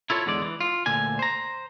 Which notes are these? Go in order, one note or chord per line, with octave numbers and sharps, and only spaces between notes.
E4 F4 A4 C#5
E2 D3 G#3 D5
E3
F4
D2 A#2 D3 G#5
C5 A#5